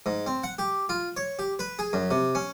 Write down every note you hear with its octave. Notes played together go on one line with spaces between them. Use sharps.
G#2
C4
F#5
G4
F4
C#5
G4
B4
G#4
F#2
C3
C#4